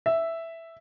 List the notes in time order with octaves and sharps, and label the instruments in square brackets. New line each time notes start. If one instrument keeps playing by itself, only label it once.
[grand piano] E5